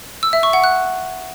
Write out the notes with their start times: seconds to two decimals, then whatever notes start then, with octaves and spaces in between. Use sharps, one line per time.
0.23 E6
0.33 E5
0.43 C#6
0.53 F#5
0.64 F#6